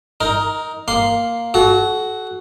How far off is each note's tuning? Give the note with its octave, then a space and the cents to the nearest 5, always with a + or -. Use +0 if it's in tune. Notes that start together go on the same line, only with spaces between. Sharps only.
D#4 +15 A#4 +0
A#3 +0 C6 +0
F#4 +10 A4 -35